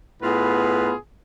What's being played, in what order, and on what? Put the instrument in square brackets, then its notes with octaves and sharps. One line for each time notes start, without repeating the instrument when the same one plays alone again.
[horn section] A2 B3 F4 G#4 B4